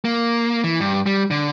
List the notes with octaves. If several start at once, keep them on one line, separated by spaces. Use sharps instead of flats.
A#3
E3
G2
G3
D3